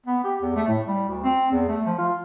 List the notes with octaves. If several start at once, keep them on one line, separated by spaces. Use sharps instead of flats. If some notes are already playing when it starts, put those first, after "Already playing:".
B3
G4
E2
A3
A2
G3
D2
C4
E2
A3
F3
F4